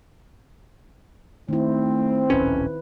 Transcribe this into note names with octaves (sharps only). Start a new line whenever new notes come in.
D#3 A3 C4 E4
D1 A#1 C#4 B4